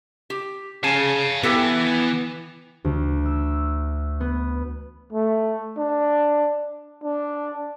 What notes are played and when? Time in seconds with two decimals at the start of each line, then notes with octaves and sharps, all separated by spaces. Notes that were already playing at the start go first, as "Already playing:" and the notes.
0.30 G4
0.84 C#3 F5 G#5 A5
1.43 E3 B3 G4 A4 G5
2.85 D2
3.26 E6
4.20 B3
5.13 A3
5.77 D4
7.04 D4